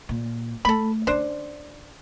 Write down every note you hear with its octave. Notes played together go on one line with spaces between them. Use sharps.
A#2
A3 A4 B5
D3 C#4 D4 C5